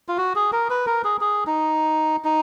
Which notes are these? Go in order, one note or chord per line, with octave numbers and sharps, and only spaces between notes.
F4
F#4
G#4
A#4
B4
A#4
G#4
G#4
D#4
D#4